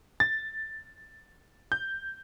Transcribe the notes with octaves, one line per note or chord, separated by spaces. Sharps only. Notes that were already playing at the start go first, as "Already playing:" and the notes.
A6
G6